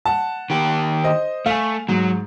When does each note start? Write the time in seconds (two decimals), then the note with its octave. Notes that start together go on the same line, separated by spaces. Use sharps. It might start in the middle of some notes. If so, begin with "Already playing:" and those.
0.05 F#5 A5
0.50 D#3 G4
1.04 C5 D#5
1.46 A3 F5 G#5
1.89 G#2 F#3